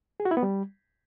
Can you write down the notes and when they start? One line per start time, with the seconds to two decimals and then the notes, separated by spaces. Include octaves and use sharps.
0.20 G#4
0.25 F#4
0.31 E4
0.37 B3
0.43 G3